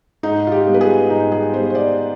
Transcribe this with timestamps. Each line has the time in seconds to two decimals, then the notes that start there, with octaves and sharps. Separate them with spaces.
0.23 G#2 D#4
0.47 F4
0.52 G4
0.67 G3 B3
0.74 B4
0.81 G#4
1.10 G#2 D#4
1.32 G#4
1.54 G3 B3 C5
1.70 C5
1.75 D5